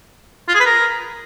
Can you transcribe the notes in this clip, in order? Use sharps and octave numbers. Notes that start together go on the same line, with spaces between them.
F4
G#4
B4
A#4